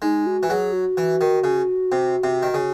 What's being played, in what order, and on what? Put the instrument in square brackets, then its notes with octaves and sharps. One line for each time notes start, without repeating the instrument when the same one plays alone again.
[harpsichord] G#3 [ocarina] D#4
[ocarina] F#4
[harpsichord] E3
[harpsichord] F#3 [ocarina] G#4
[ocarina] F#4
[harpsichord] E3
D#3
C#3
C3
C3
D#3
C#3